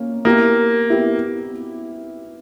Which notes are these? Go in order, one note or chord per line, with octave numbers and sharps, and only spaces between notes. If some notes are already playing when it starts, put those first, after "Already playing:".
Already playing: A#3 C#4
A#3 B3 E4 G4
B3 E4 G4